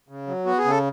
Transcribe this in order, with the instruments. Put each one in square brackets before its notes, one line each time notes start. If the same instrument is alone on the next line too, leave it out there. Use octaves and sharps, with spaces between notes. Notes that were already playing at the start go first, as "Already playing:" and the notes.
[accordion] C#3
F#3
B3 F#4
G#4
C#3
A4